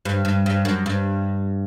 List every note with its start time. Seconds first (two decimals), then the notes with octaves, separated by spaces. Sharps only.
0.05 G2
0.25 G2
0.46 G2
0.65 F#2
0.86 G2